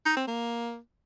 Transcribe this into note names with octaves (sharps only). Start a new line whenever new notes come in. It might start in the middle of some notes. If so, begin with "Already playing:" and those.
D#4
C4
A#3